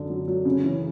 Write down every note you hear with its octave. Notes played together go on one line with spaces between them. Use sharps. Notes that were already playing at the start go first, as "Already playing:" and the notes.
Already playing: F#2 D3
F#3
F#3
C#3
E3